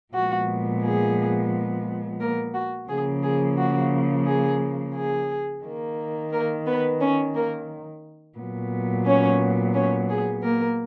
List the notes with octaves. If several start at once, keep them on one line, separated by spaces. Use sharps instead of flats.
A#2 F3 G#3 B3 F#4
G#4
A#3 A#4
F#4
C#3 F3 A#3 G#4
G#4
F#4
G#4
G#4
D#3 A#3
A#3 A#4
B3 B4
C#4 C#5
A#3 A#4
A#2 F#3 B3
C#4 C#5
C#4 C#5
G#4
A#3 A#4